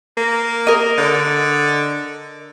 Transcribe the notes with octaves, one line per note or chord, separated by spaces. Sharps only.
A#3
A#4 D#5
D3